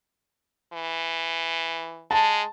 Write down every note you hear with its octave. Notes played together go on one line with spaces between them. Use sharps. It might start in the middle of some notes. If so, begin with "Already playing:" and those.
E3
G#3 A5